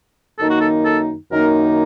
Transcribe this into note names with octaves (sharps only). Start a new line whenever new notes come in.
F#2 D#3 A#3 D#4 A4
F#4
A4
A4
F#2 D#3 A#3 D#4 A#4